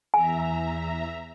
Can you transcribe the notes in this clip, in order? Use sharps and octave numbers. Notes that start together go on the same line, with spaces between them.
E2 E5 G#5 A#5